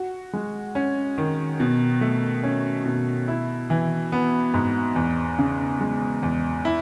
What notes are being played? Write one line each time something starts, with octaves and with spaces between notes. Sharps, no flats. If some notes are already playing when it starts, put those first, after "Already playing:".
Already playing: F#4
G#3
C#4
D#3
B2
A3
C#4
B2
E4
E3
B3
G#2
E2
C#3
G#3
E2
E4